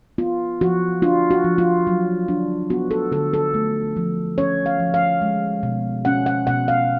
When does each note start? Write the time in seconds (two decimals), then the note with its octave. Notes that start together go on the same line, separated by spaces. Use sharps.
0.18 B3 F4
0.61 F3 F#4
1.02 D4 F4
1.31 F#4
1.44 F3
1.58 F4
1.87 F#3
2.28 D4
2.70 B3 F#4
2.91 A4
3.12 D3 A4
3.33 A4
3.54 A3
3.96 F3
4.38 C#4 C#5
4.66 F5
4.80 F3
4.94 F5
5.22 G#3
5.63 B2
6.05 C#4 F#5
6.26 F#5
6.47 B2 F#5
6.68 F5